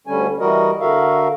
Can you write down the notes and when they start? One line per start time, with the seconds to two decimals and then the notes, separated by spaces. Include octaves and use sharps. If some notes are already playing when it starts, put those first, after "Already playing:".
0.07 D2 D3 G3 C#4 G#5
0.40 E3 G3 F#4 A#4 D#5
0.80 D3 F#4 A#4 E5 F5